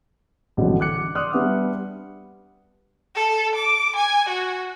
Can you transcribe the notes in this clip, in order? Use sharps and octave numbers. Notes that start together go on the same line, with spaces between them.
A1 F2 G#2 B2 D3 F#3
D6 F#6 C#7
D5 C6 D6 D#6 F6 F#6
G3 B3 D4 E5 F#5
A4
D6
G#5
F#4